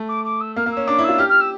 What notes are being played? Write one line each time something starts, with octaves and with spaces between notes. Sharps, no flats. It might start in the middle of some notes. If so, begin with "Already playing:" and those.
Already playing: A3
D6
D6
E6
A#3 F6
A#3
C#4 E6
D4 D6
E4
F4 E6
G4 F6
F6
E6